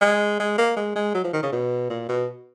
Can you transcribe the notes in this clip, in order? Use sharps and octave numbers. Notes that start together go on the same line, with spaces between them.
G#3
G#3
A#3
G#3
G#3
F#3
F3
D#3
C#3
B2
A#2
B2